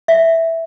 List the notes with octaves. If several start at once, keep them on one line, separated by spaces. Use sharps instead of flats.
E5